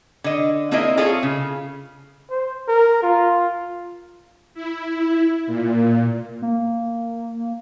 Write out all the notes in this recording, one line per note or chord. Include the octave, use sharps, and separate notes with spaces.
D3 D#5
A#3 C4 D4 E4 A#4 D#5
C4 F4 G#4 A4 C#5
C#3
C5
A#4
F4
E4
A#2
A#3